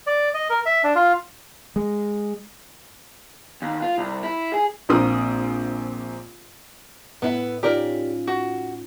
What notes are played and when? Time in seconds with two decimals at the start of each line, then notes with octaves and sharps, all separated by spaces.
0.07 D5
0.34 D#5
0.50 A#4
0.66 E5
0.84 D4
0.96 F4
1.76 G#3
3.62 D#2
3.82 F4
3.98 C2
4.23 E4
4.54 G#4
4.89 A#1 A#3 C4 D#6
7.22 A2 B3 E4
7.63 C#4 D#4 F4 G4 A#4 D5
8.27 F#4